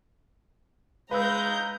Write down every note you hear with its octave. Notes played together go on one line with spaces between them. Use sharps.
G#3 B4 F5 A#5 B5 E6 G6